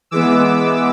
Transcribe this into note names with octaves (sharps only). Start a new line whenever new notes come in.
E3 G#3 B3 D6 E6